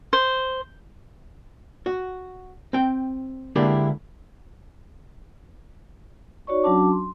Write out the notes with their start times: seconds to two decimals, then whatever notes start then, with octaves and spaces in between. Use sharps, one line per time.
0.13 C5
1.86 F#4
2.73 C4 G5
3.56 D3 G#3 A#3 D4 E4 G4
6.47 D#4 F#4 C#5 D5 C#6
6.63 F#3 C#4 D4 F#4 A5 D6
6.92 C6